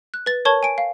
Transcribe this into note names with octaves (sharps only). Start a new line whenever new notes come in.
F#6
B4 A6
A#4 C#5 A5 C#6 G#6 G7
G#5 D7
F5